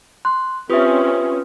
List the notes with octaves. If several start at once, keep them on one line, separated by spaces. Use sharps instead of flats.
C6 F#6
C4 C#4 F4 G4 B4 E5 D#6